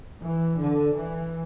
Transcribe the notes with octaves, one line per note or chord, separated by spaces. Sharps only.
E3
D3
E3